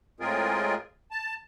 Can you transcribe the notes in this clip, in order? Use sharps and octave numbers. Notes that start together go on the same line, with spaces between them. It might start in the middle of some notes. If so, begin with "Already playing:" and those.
A2 G#3 C4 F4 G#4 A#4
A5